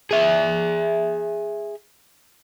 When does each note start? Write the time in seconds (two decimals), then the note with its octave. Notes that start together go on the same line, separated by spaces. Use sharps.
0.11 G#4 E5